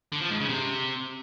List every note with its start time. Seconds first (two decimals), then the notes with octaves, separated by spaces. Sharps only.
0.12 D3
0.21 F3
0.30 G#2
0.40 C#3
0.49 C3